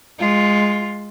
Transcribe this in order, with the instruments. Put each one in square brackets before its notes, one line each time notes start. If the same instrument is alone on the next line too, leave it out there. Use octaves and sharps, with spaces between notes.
[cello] G#3 F4